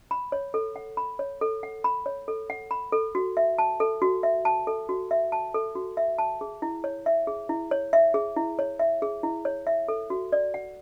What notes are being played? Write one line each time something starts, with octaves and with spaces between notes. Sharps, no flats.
B5
C#5
A4
F#5
B5
C#5
A4
F#5
B5
C#5
A4
F#5
B5
A4
F#4
E5
A5
A4
F#4
E5
A5
A4
F#4
E5
A5
A4
F#4
E5
A5
G#4
E4
C#5
E5
G#4
E4
C#5
E5
G#4
E4
C#5
E5
G#4
E4
C#5
E5
A4
F#4
D5
F#5